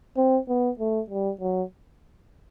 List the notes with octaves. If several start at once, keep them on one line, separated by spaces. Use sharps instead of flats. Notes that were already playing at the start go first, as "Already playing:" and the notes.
C4
B3
A3
G3
F#3